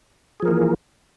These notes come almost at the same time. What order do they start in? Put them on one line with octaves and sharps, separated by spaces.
G#4 F3 A#4 A#3 E3